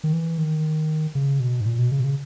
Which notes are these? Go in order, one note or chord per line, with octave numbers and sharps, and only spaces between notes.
D#3
E3
D#3
C#3
B2
G#2
A#2
B2
C#3
B2
C#3